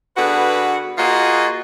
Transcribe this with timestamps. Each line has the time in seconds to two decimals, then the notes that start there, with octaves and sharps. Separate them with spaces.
0.17 D3 B3 F#4 G#4 B4
0.98 A#3 F4 F#4 G#4 D#5